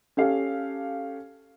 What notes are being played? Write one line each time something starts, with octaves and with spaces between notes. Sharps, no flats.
C#4 G4 A4 F5